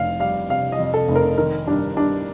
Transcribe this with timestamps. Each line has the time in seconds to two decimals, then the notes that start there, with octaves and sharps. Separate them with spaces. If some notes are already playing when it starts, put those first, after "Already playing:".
Already playing: F1 F2 F5
0.20 G3 F5
0.49 C3 F5
0.72 D#5
0.79 F2
0.94 A4
1.08 F1
1.16 A#4
1.38 D#3 A#4
1.67 G2 D4
1.97 G2 D4